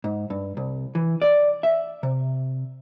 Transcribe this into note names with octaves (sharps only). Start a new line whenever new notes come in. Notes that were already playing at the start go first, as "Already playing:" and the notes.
G#2
G2
C2
E3
D5
E5
C3